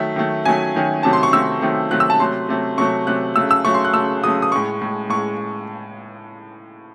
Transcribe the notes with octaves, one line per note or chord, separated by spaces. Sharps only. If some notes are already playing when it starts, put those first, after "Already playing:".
Already playing: D#3 F#3 A3 E5
D#3 F#3 A3
D#3 F#3 A3 G#5
D#3 F#3 A3
C3 D#3 F#3 A3 A5
C6
C#6
C3 D#3 F#3 A3 E6
C3 D#3 F#3 A3
C3 D#3 F#3 A3 F#6
E6
A5
C3 F#3 A3 C6
C3 F#3 A3
C3 F#3 A3 C#6
C3 F#3 A3 F#6
C#3 F#3 A3 E6
E6
C#3 F#3 A3 C#6
C6
F#6
C#3 F#3 A3 E6
C#3 F#3 A3 D#6
D#6
A2 G#3 C#6
A2 G#3
A2 G#3 C#6